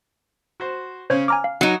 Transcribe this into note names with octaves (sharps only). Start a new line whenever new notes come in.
F#4 C5
C#3 C#4 C5 C#5
G#5 A#5 D6 F6
F5
F#3 D#4 F#5 C#7